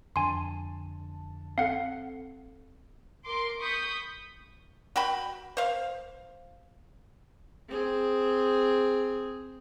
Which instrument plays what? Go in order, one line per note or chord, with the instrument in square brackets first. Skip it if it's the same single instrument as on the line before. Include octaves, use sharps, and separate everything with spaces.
[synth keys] F2 D3 A5 [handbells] G#5 C6
[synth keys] C4 A4 [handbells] F5 F#5
[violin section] A#4 C6 D6
B5 C#6 D#6 G6 B6
[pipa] F#4 G5 B5
C5 F5
[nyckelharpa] C4 G#4